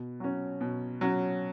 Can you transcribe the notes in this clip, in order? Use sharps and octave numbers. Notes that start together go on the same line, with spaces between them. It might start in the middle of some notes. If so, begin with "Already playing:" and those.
Already playing: B2
F#3 C#4
B2
F#3 C#4